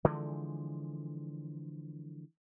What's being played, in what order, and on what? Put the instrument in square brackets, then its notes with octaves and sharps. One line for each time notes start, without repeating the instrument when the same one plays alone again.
[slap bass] D3 E3 F3 G#3